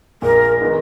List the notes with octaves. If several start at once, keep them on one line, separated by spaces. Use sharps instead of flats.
A#1 A#2 G#3 A#4
D#3 G#3 B3 D#4